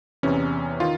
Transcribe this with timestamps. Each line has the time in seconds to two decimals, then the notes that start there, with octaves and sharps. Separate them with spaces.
0.23 E2 C3 E3 C#4
0.80 D#3 F4